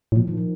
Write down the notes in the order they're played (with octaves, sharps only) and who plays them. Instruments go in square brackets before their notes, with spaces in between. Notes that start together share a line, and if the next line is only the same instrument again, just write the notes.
[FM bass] A2
[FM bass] A#2 [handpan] F3
[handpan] D#3
F3